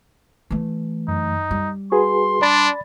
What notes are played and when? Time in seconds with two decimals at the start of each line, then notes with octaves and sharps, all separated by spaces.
0.50 E3 A3
1.08 F#2 D#4
1.51 G3
1.92 F#4 G#4 B4 C6
2.42 D4 D5 B5 A6